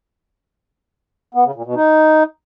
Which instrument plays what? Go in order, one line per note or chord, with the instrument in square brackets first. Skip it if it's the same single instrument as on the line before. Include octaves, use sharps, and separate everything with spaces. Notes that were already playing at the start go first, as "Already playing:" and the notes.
[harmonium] B3
C#3
A#2
B2
D#4